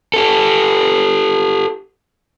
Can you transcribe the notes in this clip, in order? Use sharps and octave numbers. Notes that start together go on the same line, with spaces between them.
G4 A4